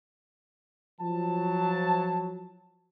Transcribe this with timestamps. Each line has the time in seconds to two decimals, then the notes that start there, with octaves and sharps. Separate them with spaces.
1.01 F3 F#3 A5